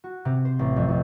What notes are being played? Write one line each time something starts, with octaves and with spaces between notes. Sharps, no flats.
F#4
C3
C5
A1
F2
F2